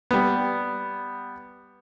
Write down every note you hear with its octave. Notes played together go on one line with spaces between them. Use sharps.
G3 B3